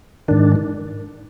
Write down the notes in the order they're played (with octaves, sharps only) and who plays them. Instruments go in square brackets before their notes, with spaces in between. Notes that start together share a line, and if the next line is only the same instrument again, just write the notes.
[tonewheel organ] G#2 D#3 D4